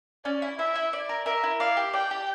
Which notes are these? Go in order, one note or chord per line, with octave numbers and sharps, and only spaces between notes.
C#4 D5
E4
E4 E5
E4
D5
A#4
A#4 E5
E4
D5 F5
G4
D5 G5
G4